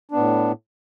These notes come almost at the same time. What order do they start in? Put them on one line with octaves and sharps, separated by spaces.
D4 B3 A2